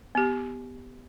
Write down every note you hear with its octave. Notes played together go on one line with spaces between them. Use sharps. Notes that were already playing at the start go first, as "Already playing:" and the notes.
B3 G4